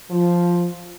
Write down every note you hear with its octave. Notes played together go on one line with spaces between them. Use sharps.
F3